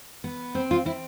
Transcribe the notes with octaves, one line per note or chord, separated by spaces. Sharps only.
B3
C4 C5
F4
C4 E4